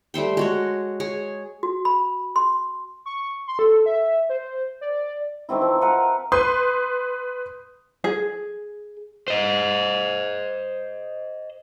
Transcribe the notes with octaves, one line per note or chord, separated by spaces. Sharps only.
G3 A3 C5 G5
G#3 F#4 C#5
G#4 C#5
F#4
B5
C6
C#6
C6
A4
E5
C5
D5
D#3 E3 C4 E4
F3
A#4 B4 F#5
B4 C6 D#6 G6
G#4
C5 D#5